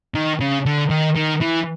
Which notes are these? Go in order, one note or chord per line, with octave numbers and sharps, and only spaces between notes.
D#3
C#3
D3
D#3
D#3
E3